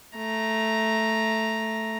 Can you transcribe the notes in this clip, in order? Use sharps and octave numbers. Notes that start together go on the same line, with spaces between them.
A3 A#5